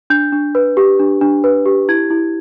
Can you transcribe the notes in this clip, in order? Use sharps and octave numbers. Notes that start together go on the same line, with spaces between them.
D4 G6
D4
B4
G4
D4
D4
B4
G4
E4 G#6
E4